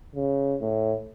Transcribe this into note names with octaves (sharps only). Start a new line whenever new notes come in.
C#3
A2